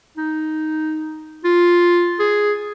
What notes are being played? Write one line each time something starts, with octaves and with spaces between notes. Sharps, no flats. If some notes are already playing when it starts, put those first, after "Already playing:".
D#4
F4
G#4